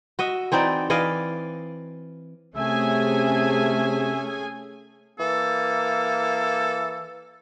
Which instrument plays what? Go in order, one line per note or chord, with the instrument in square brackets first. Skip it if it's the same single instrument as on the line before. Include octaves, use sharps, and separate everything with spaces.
[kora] F#4 D#5 E5
E3 C4 D#4 D5
E3 D5 D#5 F5
[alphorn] C3 [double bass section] A3 [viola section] C#4 G#4 G#5 [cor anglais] E5
[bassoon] E3 [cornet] A#3 [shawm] A4